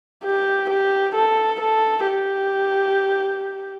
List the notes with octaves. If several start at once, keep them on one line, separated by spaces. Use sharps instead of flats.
G4
G4
A4
A4
G4